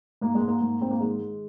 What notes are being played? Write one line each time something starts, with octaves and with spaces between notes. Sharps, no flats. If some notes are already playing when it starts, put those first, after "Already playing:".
G#2 A#3
G#3
G#2
A#3
G#2
G#2 C4
A#3
D#3 G#3
D#3